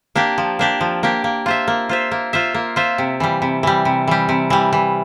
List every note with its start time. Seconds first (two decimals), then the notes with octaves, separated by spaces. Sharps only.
0.15 A#3 D4 G4
0.38 F3
0.59 A#3 D4 G4
0.81 F3
1.03 A#3 D4 G4
1.24 A#3
1.46 F4 C5 E5
1.68 A#3
1.89 F4 C5 E5
2.11 A#3
2.33 F4 C5 E5
2.54 A#3
2.76 F4 C5 E5
2.98 C3
3.20 E3 G3
3.42 C3
3.63 E3 G3
3.85 C3
4.07 E3 G3
4.29 C3
4.50 E3 G3
4.73 E3